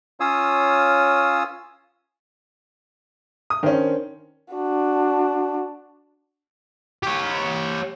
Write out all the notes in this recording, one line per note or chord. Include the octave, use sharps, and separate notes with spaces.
C#4 F4 C#5 F5 D#6 E6
D#6
D#3 C#4 D4 A#4 C5
D4 F#4
G4 C#5